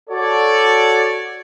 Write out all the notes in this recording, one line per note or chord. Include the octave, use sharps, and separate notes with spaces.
F#4 A4 C#5 D5